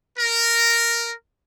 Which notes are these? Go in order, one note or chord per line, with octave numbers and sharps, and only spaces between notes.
A#4